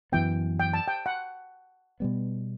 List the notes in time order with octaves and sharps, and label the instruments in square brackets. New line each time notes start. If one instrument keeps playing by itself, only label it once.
[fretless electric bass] F#2 E3 B3 [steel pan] G5
[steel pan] G5
A5
G5
F#5
[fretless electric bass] B2 G3 B3